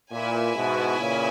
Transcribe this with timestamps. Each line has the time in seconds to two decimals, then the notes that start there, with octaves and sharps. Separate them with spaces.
0.12 A#2 E4 B4 E5 G#5
0.56 G#2 B2
1.00 A#2 C#3